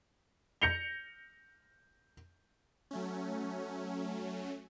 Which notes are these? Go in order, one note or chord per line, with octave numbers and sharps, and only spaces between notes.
G6 A#6 C#7 F7 G7
F#3 A3 C#4